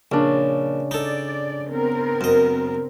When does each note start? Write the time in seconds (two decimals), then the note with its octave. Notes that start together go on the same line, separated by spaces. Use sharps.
0.12 A#1 C#3 D4
0.91 D#4 A4 D5
1.70 B3 C4 A#4
2.21 F#2 D#5